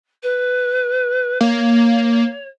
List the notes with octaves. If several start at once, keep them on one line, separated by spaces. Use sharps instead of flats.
B4
A#3 C#5